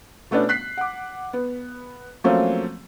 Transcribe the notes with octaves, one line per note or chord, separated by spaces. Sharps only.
B2 A3 B3 C#4 D4
F#6 B6 C7
F#5 D6
B3
F3 F#3 A3 A#3 C4 C#4